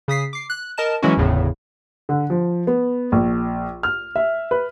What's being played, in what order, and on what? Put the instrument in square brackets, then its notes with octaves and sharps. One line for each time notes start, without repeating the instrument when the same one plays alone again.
[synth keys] C#3 D#6 B6 C7
D6 C7
F#6
A#4 D#5 A5 E7
E3 F#3 G#3 C#4 E4 F#4
G1 E2 A2 C#3
[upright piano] D3
F3
B3
A#1
F6
E5
B4